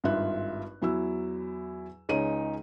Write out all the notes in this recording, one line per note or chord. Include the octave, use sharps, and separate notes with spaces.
G#1 G2 F4 E5 F#6
E2 F#3 E4 E6
C#2 G#3 D#4 C#5 D#7